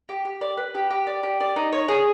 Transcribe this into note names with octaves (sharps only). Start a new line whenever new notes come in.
G4
G4
D5
B4
G4
G4
D5
G4
D5
D#4
C#5
G#4